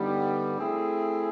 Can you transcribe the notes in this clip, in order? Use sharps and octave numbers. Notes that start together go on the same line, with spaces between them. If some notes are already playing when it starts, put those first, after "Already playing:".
Already playing: G2 D3 G3 B3 D#4
A3 C4 E4 G#4